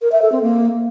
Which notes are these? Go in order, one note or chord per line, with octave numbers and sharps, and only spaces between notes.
A#4
E5
A4
C4
A#3